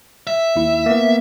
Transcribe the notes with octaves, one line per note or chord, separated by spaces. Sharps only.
E5
D#2 E4
A#3 B3